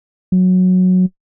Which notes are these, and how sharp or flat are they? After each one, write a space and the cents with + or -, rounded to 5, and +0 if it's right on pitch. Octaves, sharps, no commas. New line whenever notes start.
F#3 -10